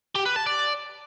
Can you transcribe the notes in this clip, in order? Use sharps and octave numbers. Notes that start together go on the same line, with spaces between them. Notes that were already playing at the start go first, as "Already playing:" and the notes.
G4
B4
A5
D5